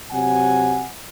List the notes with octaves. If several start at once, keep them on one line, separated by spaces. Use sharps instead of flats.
C3 F#3 F#5 G#5